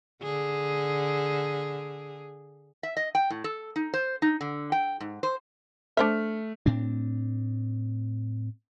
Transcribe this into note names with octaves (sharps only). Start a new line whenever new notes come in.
D3 G#4
E5
D#5
G5
A2
A4
D#4
C5
D#4
D3
G5
G#2
C5
A3 D4 C5 E5 F6
A2 C4 D4